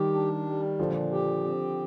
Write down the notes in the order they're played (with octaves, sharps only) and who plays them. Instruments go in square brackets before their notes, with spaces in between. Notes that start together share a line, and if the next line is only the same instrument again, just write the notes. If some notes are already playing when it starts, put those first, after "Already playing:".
Already playing: [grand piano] D#3 G3 [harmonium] G4
[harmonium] D4
G3
[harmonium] A#2 [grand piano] D3 F3
[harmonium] G4
C4